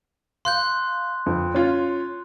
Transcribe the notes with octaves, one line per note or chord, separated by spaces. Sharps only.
F5 C6 F#6 G6
F2
C#4 F4